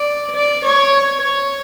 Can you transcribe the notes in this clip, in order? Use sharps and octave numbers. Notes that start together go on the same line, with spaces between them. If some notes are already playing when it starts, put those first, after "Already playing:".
Already playing: D5
D5
C#5
C#5